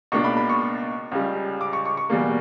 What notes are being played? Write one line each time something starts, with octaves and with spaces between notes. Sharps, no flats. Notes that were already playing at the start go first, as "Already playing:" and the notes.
C#2 B2 A#3 D4 C#6
B5
B5
C#6
C#2 C#3 G3
D6
C#6
C#6
C#6
E2 B2 G3 A#3